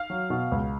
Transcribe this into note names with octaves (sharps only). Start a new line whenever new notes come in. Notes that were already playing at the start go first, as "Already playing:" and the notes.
Already playing: F5 F6
F#3
B2
C#2